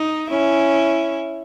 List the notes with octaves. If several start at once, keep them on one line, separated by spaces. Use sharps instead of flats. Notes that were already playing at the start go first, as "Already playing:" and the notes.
Already playing: D#4
C#4 E4